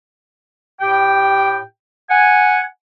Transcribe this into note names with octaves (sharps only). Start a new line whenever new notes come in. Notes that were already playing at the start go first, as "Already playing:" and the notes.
A2 G4 G5
F#5 G#5